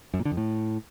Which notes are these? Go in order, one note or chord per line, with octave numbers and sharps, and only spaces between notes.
F#2
A#2
D3
F2
A2